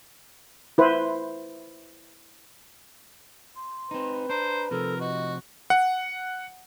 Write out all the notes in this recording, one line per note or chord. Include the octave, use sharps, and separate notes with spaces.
E4 B4 C5
C6
C4 D#4 B4
D4 C5 A#5
C3 F3 A4 A#4
F#4 D#5
F#5